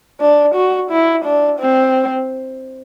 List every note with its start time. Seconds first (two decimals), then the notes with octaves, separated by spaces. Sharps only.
0.21 D4
0.55 F#4
0.91 E4
1.25 D4
1.60 C4